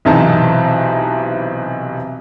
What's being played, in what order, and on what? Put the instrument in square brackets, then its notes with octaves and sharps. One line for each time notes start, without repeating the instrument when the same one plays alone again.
[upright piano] B1 C3 E3 D#4 A5